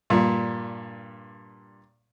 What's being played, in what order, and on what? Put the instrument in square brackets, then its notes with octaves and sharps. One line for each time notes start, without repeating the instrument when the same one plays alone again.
[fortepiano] G2 A#2